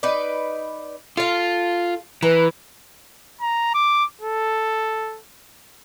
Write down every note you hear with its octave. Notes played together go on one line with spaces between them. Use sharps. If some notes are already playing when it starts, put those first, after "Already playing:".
D#4 B4 D5
F4 A4 F5
E3 B4 A#5
A#5
D6
A4